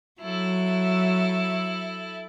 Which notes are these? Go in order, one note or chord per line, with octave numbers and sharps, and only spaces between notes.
F#3 E4 A4